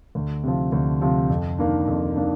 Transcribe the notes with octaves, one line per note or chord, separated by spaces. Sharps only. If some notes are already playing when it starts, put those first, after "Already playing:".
D2
C3 F3
D2
C3 F3
F2
D#3 A#3 D4
F2
D#3 A#3 D4